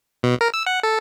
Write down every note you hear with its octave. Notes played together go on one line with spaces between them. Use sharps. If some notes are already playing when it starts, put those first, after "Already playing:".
B2
A#4
E6
F#5
A4